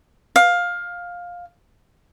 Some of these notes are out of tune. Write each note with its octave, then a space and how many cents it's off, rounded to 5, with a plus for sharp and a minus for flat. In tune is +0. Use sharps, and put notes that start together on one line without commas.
F5 +15